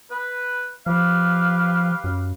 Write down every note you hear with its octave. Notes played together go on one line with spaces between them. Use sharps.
B4
F3 G4 B4 F5
F#2